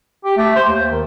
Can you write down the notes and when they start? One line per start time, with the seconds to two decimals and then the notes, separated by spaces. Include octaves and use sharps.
0.25 G4
0.37 A3
0.56 C5
0.68 D#2
0.91 D#3